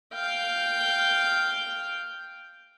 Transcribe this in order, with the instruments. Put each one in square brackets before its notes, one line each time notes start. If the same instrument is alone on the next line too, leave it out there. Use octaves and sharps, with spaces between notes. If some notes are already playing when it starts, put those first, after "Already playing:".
[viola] F5 G5